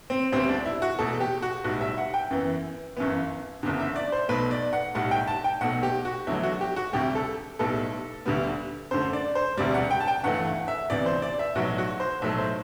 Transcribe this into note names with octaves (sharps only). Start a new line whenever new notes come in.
C4
D2 D3 G3 B3 C4
D4
E4
F#4
E2 B2 A3 A4
G4
F#4
B1 A2 G3 F#4
E5
F#5
G5
F#2 E3 B3
G1 F#2 E3 B3
F#1 E2 D3
E5
D5
C5
B1 B2 A3 B4
D5
F#5
B1 A2 G3 F#5
G5
A5
G5
B1 B2 A3 F#5
G4
F#4
E2 D3 F#3 A3 E4
F#4
G4
F#4
D2 C3 G3 G4
A4
B1 A2 G3 B3 A4
D2 D3 G3 B3
F#2 D3 A3 C5
D5
C5
E1 D2 C3 G3 D5
F#5
G5
A5
G5
G1 G2 E3 A3 F#5
F#5
E5
D2 C3 E3 B3 D5
C5
D5
E5
B1 A2 F#3 B3 F#4
F#4
C5
B1 A2 F#3 A3 E5
C5